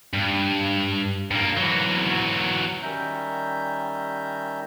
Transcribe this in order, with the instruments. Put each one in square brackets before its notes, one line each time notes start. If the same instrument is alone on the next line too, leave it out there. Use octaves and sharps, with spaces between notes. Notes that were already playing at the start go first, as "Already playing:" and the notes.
[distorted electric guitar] G2
G2 A#3
E3 F#3
[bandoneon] D#3 G3 C#4 E5 A#5 G6